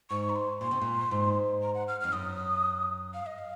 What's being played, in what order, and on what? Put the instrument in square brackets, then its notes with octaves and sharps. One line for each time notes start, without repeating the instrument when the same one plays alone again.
[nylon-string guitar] G#2 [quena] C#6
[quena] A#5
C6
[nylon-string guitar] A#2 [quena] C6
[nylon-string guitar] C3
A#2
G#2
[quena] A#5
F#5
F6
[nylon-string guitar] F2 [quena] F6
[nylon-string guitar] F#2 [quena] D#6
[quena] F5
D#5
F5